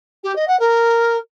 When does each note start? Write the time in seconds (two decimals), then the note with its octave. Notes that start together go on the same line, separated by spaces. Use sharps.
0.23 G4
0.35 D#5
0.47 F#5
0.59 A#4